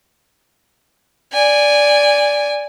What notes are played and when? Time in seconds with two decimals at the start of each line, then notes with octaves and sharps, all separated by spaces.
1.33 D5 G#5